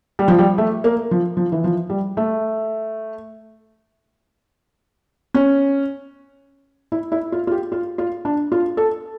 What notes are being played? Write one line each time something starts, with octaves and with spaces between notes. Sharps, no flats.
G3
F3
G3
A3
A#3
F3
F3
E3
F3
G3
A3
C#4
E4
E4
F4
F4
G4
F4
F4
D4
F4
A4